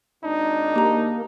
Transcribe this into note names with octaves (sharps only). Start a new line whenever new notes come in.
G#1 D4 D#4
A#3 G4 A#5